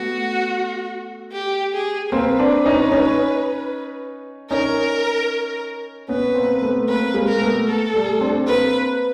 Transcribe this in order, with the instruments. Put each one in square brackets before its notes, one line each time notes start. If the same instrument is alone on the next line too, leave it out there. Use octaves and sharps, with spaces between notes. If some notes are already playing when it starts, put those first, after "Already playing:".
Already playing: [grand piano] A3 B3 [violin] F#4
[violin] G4
G#4
[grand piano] A#3 C4 [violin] B4
[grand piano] C4 D4
C#4 D#4
C#4 D#4
[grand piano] C#4 D#4 [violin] A#4
[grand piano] B3 C#4 [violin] B4
[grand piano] A#3 C4
A3 B3
[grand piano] A#3 C4 [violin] B4
[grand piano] G#3 A#3
[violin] A#4
[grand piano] A3 B3
[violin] A4
[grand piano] G3 A3
C4 D4
[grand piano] A#3 C4 [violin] B4